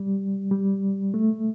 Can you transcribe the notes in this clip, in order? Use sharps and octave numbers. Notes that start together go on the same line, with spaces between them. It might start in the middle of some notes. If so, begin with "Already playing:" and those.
Already playing: G3
G3
A3